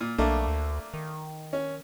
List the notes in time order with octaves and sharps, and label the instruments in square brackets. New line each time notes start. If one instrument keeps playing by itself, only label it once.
[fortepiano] A#2
[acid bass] B1 [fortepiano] A3 A#3 D4
[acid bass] D2
D#3
[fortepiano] C#4